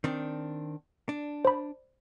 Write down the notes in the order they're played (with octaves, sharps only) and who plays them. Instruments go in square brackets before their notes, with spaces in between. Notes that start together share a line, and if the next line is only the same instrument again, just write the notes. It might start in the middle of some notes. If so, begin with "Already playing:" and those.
[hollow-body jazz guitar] D#3 C4 D4
D4
[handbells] C5 B5